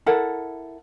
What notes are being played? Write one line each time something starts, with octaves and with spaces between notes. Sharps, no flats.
E4 A4 A#4 F#5